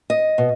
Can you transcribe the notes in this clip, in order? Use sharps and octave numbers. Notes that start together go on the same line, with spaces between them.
D#5
B2